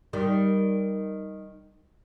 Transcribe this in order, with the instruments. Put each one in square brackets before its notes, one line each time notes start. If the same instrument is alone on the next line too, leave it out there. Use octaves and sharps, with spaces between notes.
[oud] D#3 G3